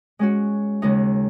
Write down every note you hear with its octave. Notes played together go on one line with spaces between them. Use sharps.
G#3 C#4 F#4
D#2 C#3 G#3 D#4